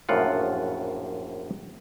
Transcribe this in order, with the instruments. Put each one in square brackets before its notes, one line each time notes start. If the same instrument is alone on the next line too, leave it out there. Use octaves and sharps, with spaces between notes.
[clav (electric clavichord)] A#1 F#2 A2 F4 F#5